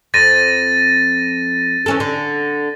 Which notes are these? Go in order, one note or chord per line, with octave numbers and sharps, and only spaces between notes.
F2 A6 A#6 D#7
E3 C#4 A4
D3